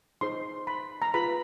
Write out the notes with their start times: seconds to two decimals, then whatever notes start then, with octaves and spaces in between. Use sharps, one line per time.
0.21 D#4 G#4 C5 C6
0.67 B5
1.02 A#5
1.14 F4 G#4 B4 B5